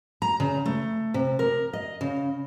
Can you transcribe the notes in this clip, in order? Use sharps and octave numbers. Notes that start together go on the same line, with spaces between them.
A#5
C#3
A3
C3
A#4
D#5
C#3